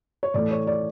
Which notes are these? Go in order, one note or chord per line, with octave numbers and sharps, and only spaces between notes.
C#5
A2 E3 A3 D5
C#5
D5